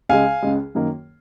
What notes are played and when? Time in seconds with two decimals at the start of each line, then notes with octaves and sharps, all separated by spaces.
0.09 C#2 C#3 G#3 F5 G#5
0.42 C#2 C#3 G#3
0.75 F#2 D#3 A#3